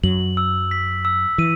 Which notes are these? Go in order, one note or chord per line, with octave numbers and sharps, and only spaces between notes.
F#2 F#3 F#7
E6
B6
E6
E3 D#7